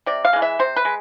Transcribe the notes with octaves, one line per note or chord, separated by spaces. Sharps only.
C3 D5
F5
E3 G#3
E5
C3 C5
B4
G#3